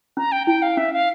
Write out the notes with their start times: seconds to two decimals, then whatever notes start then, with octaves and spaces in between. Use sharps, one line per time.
0.17 C#4 A#5
0.32 G5
0.47 E4 G5
0.62 F5
0.77 C#4 E5
0.93 F5